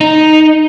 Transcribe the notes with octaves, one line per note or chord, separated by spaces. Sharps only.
D#4